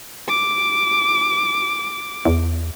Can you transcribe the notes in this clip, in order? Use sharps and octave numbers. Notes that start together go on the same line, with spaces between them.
D6
E2